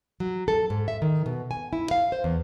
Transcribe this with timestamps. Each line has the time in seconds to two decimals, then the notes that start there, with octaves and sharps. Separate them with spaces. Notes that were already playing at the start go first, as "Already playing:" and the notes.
0.20 F#3
0.48 A4
0.70 G#2
0.88 E5
1.02 D#3
1.26 B2
1.51 G#5
1.73 E4
1.91 F5
2.12 C5
2.24 E2